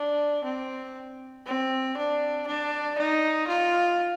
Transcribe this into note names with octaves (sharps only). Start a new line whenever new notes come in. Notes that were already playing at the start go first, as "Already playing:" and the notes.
Already playing: D4
C4
C4
D4
D4
D#4
F4